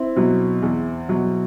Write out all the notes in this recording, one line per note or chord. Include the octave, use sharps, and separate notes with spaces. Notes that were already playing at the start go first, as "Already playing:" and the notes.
Already playing: C4 E4
B2 F#3
E2
B2 F#3